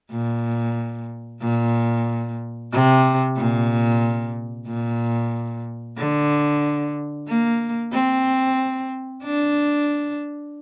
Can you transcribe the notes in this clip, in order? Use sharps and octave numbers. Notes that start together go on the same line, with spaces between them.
A#2
A#2
C3
A#2
A#2
D3
A#3
C4
D4